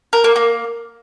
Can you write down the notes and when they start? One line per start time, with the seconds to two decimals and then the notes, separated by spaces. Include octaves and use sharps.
0.13 A#4
0.24 A#3
0.36 A#3